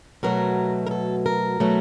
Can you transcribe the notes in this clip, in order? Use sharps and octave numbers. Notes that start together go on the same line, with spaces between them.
B2 F#3 A3 A#4
A#4
A4
A#4
B2 F#3 A3